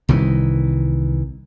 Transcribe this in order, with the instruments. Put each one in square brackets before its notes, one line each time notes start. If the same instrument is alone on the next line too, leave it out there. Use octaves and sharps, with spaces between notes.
[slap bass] C2 D#3 E3